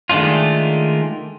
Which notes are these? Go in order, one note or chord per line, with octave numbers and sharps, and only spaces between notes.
D#3 G#3 A3 D4 F4